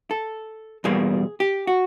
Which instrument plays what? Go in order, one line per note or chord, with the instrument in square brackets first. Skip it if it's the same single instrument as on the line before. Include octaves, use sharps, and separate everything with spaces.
[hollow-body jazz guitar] A4
E2 B2 G3 A#3 G#4
G4
F#4